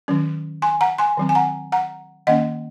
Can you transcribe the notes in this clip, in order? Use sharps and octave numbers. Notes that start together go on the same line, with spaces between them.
D#3 F#3 C#4
G#5 C6
F#5 A#5
G#5 C6
D#3 F#3 C4
G#5
F#5 A#5
F#5 A#5
D#3 A#3 C#4 D#5 F#5